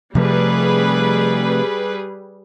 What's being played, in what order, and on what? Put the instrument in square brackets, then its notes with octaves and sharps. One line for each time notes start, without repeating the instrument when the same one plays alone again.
[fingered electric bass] C3 F3 A3 [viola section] G3 G#4 B4